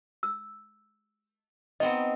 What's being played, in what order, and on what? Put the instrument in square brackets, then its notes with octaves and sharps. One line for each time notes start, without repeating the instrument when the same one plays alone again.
[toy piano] E6
[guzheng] B3 C4 D#4 [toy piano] D#5